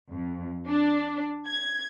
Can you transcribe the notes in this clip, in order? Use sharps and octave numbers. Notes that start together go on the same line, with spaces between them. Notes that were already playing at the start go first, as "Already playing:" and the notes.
F2
D4
G#6